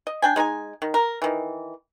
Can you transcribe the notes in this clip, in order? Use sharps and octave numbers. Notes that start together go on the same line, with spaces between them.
D#5
D4 G5 G#5
G#3 D#4 C5 G#5
D#3
A#4
D#3 E3